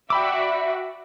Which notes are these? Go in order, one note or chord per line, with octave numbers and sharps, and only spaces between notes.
F#4 D5 E5 G5 B5 D6 E6